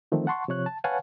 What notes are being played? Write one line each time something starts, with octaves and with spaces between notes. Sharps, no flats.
D3 D#3 F3 A3 C4
F#5 A5 C6 C#6
C3 F3 C#5 F#6
A5
B4 C#5 F5 F#5 G#5 A5